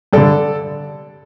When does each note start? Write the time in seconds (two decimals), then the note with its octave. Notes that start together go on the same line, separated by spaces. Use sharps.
0.13 G2 D3 A4 D5